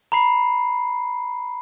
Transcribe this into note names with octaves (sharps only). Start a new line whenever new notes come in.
A#5 B5 C7